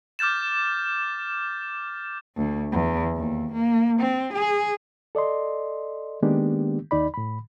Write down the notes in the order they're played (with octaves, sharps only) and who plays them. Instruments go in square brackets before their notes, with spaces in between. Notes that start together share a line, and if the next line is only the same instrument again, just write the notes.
[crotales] D6 F6 G6 A6 E7
[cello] D2
E2
D#2
A#3
C4
G#4
[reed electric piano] A4 D5 D#5 C6
D#3 G#3 A#3 B3 D4 G4
D#2 D#4 D5 B5
A2 B5